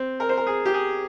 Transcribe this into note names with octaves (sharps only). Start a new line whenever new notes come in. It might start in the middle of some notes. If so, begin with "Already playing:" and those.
Already playing: C4
A#4
C5
A#4
G#4
G4
G#4